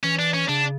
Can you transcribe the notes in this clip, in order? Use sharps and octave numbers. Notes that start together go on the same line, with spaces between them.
E3 C#4
D4
C#4
C#3 D4